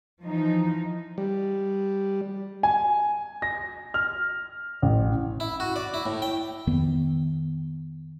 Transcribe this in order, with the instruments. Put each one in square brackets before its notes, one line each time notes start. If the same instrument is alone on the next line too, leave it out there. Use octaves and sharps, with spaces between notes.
[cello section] E3 F3 D#4
[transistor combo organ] G3
[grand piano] G#5
A#6
F6
A1
[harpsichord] E4
F#4
D5
E4
A2
G5
[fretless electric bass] F2 D#3 B3